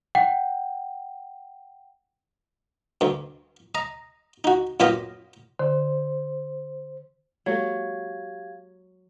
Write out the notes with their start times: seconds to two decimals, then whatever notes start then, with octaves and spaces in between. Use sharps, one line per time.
0.15 F#5 G5
3.01 D2 G2
3.75 D#5 A#5
4.44 D#4 F#4
4.80 F#2 A#2 B3 F4 G4 D#5
5.59 D3 C5
7.46 F#3 G#3 A#3 G4 A4 F5 G#6